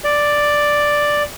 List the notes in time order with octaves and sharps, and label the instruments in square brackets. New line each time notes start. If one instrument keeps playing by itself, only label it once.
[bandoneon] D5